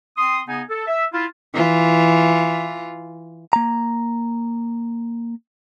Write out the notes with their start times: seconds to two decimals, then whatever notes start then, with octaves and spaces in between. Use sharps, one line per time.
0.17 C4 C6 D#6
0.48 C#3 B3 D#4 G#5
0.69 A4
0.87 E5
1.13 E4 F4
1.54 E3 F4
3.53 A#3 A#5